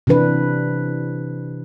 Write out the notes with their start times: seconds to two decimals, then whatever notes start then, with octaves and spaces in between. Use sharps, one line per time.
0.07 C3 E3 D4 B4